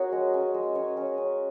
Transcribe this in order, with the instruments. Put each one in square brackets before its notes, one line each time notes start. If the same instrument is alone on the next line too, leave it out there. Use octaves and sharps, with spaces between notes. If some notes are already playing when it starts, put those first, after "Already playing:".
Already playing: [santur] C#4 F#4 G#4 A#4 C#5
G#3
C#4
G#3
C#4 C#5
C#4
C#4